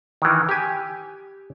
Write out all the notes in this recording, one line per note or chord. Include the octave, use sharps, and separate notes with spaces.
D#3 E3
G4 G#5